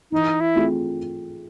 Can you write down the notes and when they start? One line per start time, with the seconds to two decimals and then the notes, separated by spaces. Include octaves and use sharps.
0.12 E3 D#4
0.40 E4
0.55 A3 C4 F4 G#4